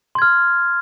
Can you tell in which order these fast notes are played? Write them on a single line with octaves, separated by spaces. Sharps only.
C6 G#6 F6